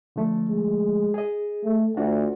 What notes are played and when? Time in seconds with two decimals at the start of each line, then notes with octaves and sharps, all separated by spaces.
0.16 D3 F3 A3
0.49 G#3
1.14 G#4 D#5
1.64 A3
1.97 D2 D4 F4 F#4